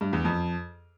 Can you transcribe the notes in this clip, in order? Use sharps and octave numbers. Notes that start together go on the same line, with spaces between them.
G2
E2
F2